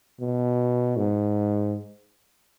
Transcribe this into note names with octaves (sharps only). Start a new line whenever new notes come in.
B2
G#2